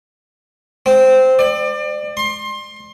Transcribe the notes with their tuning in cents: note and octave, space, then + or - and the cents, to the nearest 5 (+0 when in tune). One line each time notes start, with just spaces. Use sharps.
C4 -10
D5 +30
C6 +25